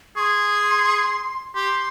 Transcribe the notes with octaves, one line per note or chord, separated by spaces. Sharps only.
G#4 C6 C#6
G4 C6